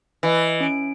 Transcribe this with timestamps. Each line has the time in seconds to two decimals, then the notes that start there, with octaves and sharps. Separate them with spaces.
0.23 E3 B4 D#5
0.60 C#4 D7